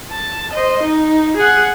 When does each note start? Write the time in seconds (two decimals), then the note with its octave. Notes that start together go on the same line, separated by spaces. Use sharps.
0.12 A5
0.53 C5 D#5
0.83 D#4
1.37 G#4 F#5